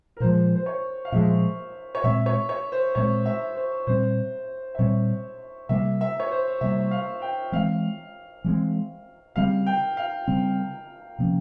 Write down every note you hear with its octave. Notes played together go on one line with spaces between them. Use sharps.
A#4
A#2 F3 G#3 C5
C5
C#5
F5
A#2 F3 G#3 E5
C#5
A#2 G#3 C4 E5
C#5
C#5
C5
A#2 G#3 C4 C#5
E5
C5
A#2 G3 C4 C5
E5
A#2 G3 C4 C#5
C3 G3 A#3 E5
E5
C#5
C5
C3 G3 A#3 E5
F5
G5
E3 G#3 C4 F5
E3 G#3 C4
C#3 G3 C4 F5
G5
F5
C#3 G3 C4
C3 F3 A#3 C#4